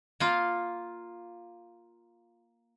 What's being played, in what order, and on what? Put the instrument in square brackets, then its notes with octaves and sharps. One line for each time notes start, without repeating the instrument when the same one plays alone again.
[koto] A#3 F4